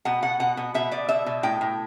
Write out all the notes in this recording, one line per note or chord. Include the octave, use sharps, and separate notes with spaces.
B2 F#5
B2 F#5
B2 F#5
B2
B2 E5
B2 D5
B2 E5
B2
A2 G5
A2